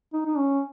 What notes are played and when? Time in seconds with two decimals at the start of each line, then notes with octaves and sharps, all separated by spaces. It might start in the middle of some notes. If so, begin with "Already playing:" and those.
0.13 D#4
0.26 D#4
0.38 C#4